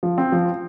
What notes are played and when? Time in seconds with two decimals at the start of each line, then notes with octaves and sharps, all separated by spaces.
0.03 F3
0.18 C4
0.32 F3